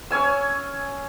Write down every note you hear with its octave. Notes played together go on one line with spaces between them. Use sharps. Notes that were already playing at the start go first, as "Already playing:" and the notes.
C#4 C#5 G#5 E6